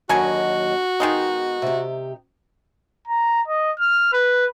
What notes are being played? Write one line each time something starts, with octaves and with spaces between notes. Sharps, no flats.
D#2 D3 F#3 F#4 A#4 D#5 G#5
D#3 G#3 B3 D#4
C3 G4
A#5
D#5
F6
B4